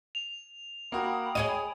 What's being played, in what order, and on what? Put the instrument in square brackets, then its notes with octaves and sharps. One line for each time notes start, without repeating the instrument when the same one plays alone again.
[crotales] F7
[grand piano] A#3 F#4 [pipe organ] G5 B5 D#6
[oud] G#4 C#5 D#5 [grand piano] D#7